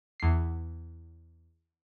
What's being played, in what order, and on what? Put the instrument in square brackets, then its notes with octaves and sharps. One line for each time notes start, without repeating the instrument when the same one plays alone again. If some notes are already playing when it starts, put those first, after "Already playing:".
[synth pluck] E2 C7